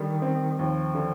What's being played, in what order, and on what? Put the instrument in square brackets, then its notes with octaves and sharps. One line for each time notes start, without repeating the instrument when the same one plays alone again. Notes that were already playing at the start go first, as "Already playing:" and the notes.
Already playing: [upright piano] D3 G3 [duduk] D#3
[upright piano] C4
[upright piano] D#2 [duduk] F3
[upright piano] D3